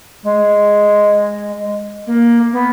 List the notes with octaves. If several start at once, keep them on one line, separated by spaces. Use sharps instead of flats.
G#3
A#3
B3